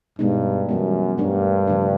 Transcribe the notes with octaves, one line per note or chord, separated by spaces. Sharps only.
G2 B2 G#3 B3 D#4
F#2 E3 G3 B3
G2 A3 D4 G4 A#4
C#3 F3 A3 D4